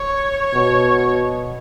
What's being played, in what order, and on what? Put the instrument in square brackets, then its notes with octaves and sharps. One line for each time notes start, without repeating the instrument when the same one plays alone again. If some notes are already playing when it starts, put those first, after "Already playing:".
Already playing: [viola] C#5
[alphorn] B2